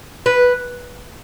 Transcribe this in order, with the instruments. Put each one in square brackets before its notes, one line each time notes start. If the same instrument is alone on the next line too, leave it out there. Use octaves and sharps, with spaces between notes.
[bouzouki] B4